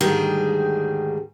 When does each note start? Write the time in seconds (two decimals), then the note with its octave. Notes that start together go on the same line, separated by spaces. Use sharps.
0.01 D2 G#2 D#3 G3 G#4 G5